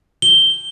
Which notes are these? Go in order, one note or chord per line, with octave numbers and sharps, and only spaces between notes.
G7